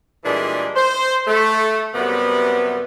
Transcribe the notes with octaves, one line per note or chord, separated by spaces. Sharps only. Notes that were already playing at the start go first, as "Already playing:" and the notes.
A#2 E3 G3 G#3 D4 G#4
C5
A3
F#2 C3 G3 B3